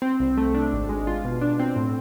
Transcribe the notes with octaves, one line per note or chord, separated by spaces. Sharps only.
C4
C2
A3
D4
G#1
G#3
F4
B2
D4
C4
A2